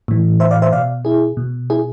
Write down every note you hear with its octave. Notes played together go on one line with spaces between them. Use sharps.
A2 E3
C5 E5
D5 F5
C5 E5
B2 D5 F5
E4 G#4
B2
E4 G#4